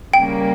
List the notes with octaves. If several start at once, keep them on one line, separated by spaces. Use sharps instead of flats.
C#3 G3 A#3 G5